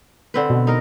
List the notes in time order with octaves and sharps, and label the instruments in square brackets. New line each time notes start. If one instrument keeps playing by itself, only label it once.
[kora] D3 C4 B4
[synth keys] B2
[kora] D#4 A#4